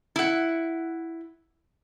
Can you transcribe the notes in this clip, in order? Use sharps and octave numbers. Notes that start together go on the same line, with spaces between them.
E4 F#5